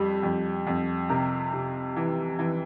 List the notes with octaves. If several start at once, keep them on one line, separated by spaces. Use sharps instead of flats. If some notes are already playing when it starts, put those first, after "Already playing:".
Already playing: F2 G3
F2
F2
C3 G4 A#4
C3
E3
E3